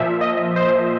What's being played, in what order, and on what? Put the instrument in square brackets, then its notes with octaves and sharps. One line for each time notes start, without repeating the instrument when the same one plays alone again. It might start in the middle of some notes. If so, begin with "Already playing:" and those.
Already playing: [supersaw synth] A#2 F3 E5
D#5
C5